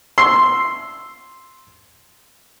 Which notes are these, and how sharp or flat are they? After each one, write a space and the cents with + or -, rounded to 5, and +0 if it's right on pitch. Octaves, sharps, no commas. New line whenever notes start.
C6 +0 E6 +0